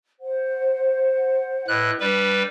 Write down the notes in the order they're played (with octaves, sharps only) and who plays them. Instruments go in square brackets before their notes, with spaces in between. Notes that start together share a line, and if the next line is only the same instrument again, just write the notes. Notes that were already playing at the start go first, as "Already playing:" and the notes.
[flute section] C5 F#5
[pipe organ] A2 F#6 [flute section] B4 D#5
[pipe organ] G3 B4 [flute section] D4